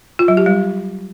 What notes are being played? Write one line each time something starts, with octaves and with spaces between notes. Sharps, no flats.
F4
F#3
G4
G3